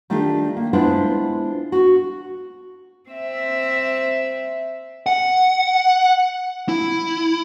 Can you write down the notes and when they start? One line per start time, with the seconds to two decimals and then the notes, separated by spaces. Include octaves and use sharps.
0.10 D#3 A3 D4 D#4 F4 G4
0.56 A#3
0.73 G#3 B3 D4 E4 F4 C5
1.72 F#4
3.10 C4 E5
5.06 F#5
6.69 E4